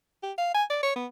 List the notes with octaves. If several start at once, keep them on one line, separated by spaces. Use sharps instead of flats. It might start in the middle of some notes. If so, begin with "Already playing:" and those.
G4
F5
G#5
D5
C#5
B3